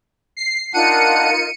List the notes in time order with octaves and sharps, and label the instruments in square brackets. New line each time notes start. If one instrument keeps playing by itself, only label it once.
[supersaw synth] C7
[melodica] D4 F#5 [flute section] D#4 F4 A#4 [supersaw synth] C#7 D#7